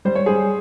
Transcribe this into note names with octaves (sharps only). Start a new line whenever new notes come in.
G3 C5
C#5
G3 G#4 C5